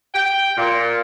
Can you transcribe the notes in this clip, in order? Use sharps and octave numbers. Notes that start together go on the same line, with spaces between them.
G5
A#2